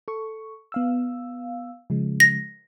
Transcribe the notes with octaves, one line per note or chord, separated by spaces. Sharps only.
A4 C#6
B3 F5 E6
C#3 F3 G#3
A#6